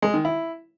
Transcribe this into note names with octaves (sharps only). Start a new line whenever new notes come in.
G#3
D#3
E4